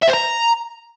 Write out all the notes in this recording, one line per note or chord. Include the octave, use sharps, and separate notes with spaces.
E5
C5
A#5